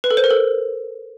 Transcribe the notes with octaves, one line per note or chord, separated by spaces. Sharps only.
B4
A4
C5
A#4
A4